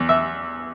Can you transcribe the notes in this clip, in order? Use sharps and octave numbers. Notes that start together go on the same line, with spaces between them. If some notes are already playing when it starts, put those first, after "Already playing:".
Already playing: E2
E5